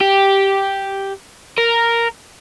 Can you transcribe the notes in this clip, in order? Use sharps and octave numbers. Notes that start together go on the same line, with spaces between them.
G4
A#4